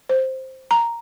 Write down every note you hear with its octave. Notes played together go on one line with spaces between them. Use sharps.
C5
A#5